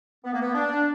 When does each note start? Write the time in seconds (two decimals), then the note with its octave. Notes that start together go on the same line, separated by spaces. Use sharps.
0.24 B3
0.33 A#3
0.41 B3
0.55 D4